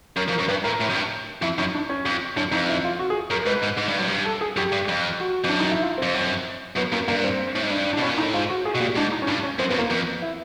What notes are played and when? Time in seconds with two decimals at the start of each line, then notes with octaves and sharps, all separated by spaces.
0.16 F#2 A#4
0.28 F2
0.33 A#4
0.38 F#2
0.48 G2 B4
0.64 A2 A#4
0.80 A2
0.89 F#2
0.95 G2
1.42 F2 E4
1.58 F#2 D#4
1.74 D4
1.89 C#4
2.06 F2
2.36 F#2 D4
2.52 F2 D#4
2.69 E4
2.84 F4
2.99 F#4
3.10 G#4
3.31 F#2 A#4
3.46 G#2 B4
3.63 G#2
3.78 G#2
3.88 G2
3.99 F#2
4.08 G2
4.25 A4
4.41 G#4
4.57 F#2 G4
4.72 G2
4.88 F2
5.20 F#4
5.44 F2
5.49 F#2 D4
5.60 D#4
5.72 E4
5.82 F4
5.98 F2 C4
6.14 F#2
6.76 F#2 B3
6.92 F#2 A#3
7.08 G2 A#3
7.24 C4
7.56 A2
7.63 G#2
7.71 G2
7.93 D4
7.98 B2 C#4
8.10 A#2
8.18 D#4
8.22 A2
8.34 G#2 F4
8.50 F#4
8.65 G#4
8.74 B2 F#4
8.81 A#2 G4
8.96 G#2 D4
9.12 D#4
9.22 C#4
9.28 G2 D4
9.43 C#4
9.59 F#2 C4
9.69 G2 B3
9.75 F#2
9.79 A#3
9.88 F2 B3
10.22 E4